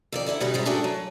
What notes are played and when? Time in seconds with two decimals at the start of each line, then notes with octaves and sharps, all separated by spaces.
0.12 F2 D#3 D5
0.26 D3 E4 D5 F#5
0.40 B2 G3 B3 C#4 D#4 F#4
0.54 G#2 G3 G#3 E4
0.66 A3 D4 F#4 G#4 A#4 G5
0.84 F#3